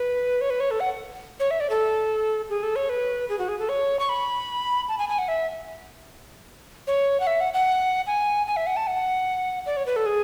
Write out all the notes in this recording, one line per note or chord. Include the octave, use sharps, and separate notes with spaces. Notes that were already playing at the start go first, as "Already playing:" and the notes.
Already playing: B4
C#5
B4
C#5
A4
F#5
C#5
E5
D5
A4
G#4
A4
C#5
B4
G#4
F#4
G#4
A4
C#5
C#6
B5
A5
G#5
G#5
F#5
E5
C#5
F#5
E5
F#5
F#5
G#5
G#5
E5
F#5
A5
F#5
D5
C#5
B4
A4
G#4